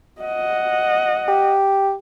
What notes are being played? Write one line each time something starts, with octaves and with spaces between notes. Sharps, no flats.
D#5 F#5
G4